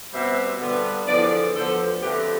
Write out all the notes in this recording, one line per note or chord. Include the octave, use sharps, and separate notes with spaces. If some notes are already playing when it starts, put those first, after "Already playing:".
B2 G3 C4 C5 E5
G2 D3 G3 B3
E2 D3 F3 B4 D5
D2 D3 F3 B3 A4 C5
F2 D3 A3 G4 B4